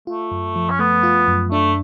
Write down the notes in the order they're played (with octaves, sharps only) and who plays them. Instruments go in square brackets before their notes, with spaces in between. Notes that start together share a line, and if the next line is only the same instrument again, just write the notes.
[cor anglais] A3 [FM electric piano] F4
[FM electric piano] F#2
F3
[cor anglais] C#4
[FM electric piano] A3 [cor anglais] B3
[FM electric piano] F4
F#2
[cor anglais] A3 [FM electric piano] D4